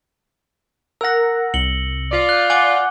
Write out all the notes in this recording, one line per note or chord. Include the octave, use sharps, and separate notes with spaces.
A#4 F#5 E6 A#6
C2 C#7 F#7 G7
F4 D5
F#6 G6
F#5 G#5 D6 G7